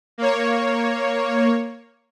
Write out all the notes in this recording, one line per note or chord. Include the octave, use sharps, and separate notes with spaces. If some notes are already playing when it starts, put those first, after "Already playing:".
A#3 C#5